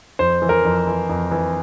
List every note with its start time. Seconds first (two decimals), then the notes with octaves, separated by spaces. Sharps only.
0.19 F2 C5
0.42 E3
0.49 A#4
0.65 F2
0.87 E3
1.09 F2
1.31 E3